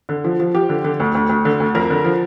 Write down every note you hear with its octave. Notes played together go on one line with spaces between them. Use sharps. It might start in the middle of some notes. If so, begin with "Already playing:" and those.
D3
F3
F3
F3 G4
D3
D3
D2
D2
D2
D3
D2
F2 A#4
D3
F3